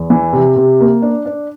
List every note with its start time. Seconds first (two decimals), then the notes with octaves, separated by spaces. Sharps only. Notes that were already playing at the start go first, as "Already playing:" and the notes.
Already playing: E2
0.10 E3
0.33 C3
0.56 C3
0.80 A#3
1.02 D4
1.26 D4